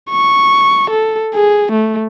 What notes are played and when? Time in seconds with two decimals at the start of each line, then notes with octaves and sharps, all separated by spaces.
0.11 C#6
0.91 A4
1.35 G#4
1.72 A3